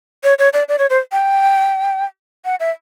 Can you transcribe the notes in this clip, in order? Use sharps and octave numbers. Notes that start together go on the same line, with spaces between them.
C#5
C#5
D5
D5
C#5
C5
G5
F#5
E5